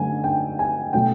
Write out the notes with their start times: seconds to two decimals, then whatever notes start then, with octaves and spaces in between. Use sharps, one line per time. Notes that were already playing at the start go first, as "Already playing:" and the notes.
Already playing: D3 F#3 A3 C#4 G#5
0.24 G5
0.59 G#5
0.93 B2 F#3 A3 C#4 G5